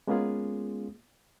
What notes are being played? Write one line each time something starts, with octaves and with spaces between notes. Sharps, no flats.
G#3 A#3 B3 C#4 F4 G#4